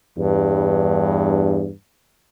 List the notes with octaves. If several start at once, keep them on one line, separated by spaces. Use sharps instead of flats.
E2 G2